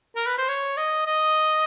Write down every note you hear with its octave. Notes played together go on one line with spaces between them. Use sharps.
A#4
B4
C5
C#5
D#5
D#5